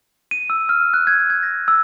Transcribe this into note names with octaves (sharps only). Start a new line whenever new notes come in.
D#7
E6
F6
F#6
G#6
G#6
A#6
E6